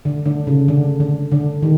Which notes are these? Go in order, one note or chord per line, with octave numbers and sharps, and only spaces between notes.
D3
D3
C#3
D3
D3
D3
D#3